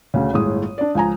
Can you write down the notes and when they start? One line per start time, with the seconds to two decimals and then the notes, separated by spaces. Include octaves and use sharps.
0.14 D2 C#3
0.33 G1 A2 G#3 D#6
0.78 D4 D5
0.95 C#2 F3 G#5 A#5